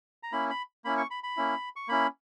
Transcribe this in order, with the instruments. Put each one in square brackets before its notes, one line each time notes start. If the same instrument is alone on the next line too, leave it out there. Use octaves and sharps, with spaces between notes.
[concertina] A#5
A#3 C#4 E4 B5
B5
A#3 C#4 E4 B5
C#6
B5
B5
A#3 C#4 E4
C#6
A#3 C#4 E4 B5